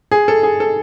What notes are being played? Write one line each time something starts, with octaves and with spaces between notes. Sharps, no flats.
G#4
A4
G#4
A4